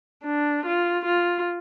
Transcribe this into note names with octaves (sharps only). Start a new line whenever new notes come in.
D4
F4
F4